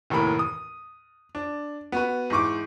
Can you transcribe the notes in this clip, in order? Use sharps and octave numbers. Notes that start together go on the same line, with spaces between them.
F1 D#2 A2 E3 A#4 B5
D#6
D4
B3 F#4 B4
G#2 E3 C#6 D6